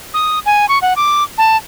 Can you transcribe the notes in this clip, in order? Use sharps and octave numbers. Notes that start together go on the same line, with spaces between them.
D#6
G#5
C#6
F#5
D6
A5